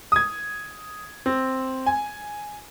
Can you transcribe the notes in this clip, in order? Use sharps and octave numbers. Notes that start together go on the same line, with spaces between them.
D#6 G#6
C4
G#5